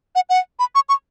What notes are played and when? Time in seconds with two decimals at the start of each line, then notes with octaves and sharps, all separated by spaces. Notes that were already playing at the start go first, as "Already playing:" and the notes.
0.15 F#5
0.30 F#5
0.59 B5
0.75 C#6
0.89 C#6